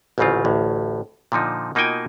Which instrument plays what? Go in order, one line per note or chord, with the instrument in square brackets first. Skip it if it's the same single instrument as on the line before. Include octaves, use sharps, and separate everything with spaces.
[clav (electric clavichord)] A1 D2 G#2 C#3 C4 F4
A1 D2 A2
A#2 D3 F3 D#4
B2 A#3 D#4 F4 G5 G#5